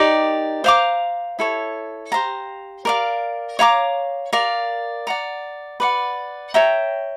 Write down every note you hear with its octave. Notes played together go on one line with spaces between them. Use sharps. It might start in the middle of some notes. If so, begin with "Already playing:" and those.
Already playing: D#4 G4 A#4 D5
C5 F5 A#5 D6
E4 A4 C#5
G4 C5 F5 A#5
A#4 D5 F5
C#5 F5 A#5 D6
A#4 D5 F5
D5 F#5 A#5
B4 D5 F#5
C#5 E5 G5 A#5